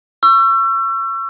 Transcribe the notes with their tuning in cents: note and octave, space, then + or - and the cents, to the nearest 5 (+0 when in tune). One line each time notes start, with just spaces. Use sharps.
C#6 +0 E6 +35